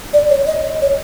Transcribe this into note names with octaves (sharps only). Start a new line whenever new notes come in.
D5
C#5
D#5
C#5